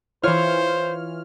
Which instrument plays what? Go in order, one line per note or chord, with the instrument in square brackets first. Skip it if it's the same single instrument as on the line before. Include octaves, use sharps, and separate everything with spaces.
[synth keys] E3 F6 [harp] F4 C#5 [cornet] C5